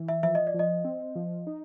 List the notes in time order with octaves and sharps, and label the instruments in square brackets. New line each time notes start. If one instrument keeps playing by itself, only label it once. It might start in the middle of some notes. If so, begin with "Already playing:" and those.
Already playing: [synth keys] E3
[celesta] E5
[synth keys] F3 [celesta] E5
[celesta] D#5
D5
[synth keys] F3
[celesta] D#5
[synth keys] C4
F3
D#4